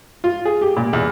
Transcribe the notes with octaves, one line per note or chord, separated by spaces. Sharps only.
F4
G#4
G4
A#2
E2